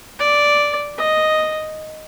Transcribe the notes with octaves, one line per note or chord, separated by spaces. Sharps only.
D5
D#5